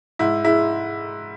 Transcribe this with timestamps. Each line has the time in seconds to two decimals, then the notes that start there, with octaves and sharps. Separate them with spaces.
0.19 G#2 E4
0.44 G#3 E4